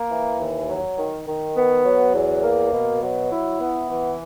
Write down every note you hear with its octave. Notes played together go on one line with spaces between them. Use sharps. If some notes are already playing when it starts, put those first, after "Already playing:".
Already playing: A#3
E3
D#2
F#3
D#3
D#3
B3
F#3
E2
A#3
B2
F#3
E4
B3
E3